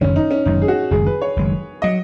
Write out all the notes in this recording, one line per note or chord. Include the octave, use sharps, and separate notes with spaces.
F#1 F#2 D#3 G#3 C#4
D#4
C#4
F#1 F#2 D#3 G#3 D#4
G#4
F#4
F#1 F#2 D#3 G#3 G#4
B4
C#5
F#1 F#2 D#3 G#3
C#3 F#3 D#5